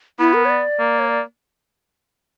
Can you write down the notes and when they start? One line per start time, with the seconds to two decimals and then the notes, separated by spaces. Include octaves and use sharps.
0.19 B3 E4
0.34 A#4
0.45 C#5
0.50 D5
0.79 A#3
0.99 C#5
1.09 D5